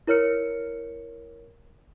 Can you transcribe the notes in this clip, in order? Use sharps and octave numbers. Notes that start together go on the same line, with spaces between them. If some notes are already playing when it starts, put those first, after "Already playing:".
E4 A#4 C#5 F6 C#7